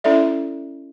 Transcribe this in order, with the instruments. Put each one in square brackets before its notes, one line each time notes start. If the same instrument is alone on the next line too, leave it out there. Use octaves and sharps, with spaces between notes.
[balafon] C#4 E4 A4 D5 E5